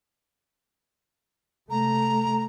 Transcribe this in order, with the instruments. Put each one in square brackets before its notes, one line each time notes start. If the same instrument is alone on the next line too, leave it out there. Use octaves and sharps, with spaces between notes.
[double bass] C3 A3 [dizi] A#5